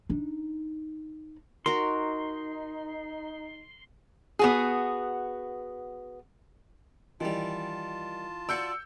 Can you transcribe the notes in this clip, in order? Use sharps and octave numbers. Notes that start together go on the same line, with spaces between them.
D4 D#4
D#4 F#4 A#4 C6
B3 F#4 G#4
D#3 E3 G3 E4 F4 A5
F#4 D5 E6 G6 C#7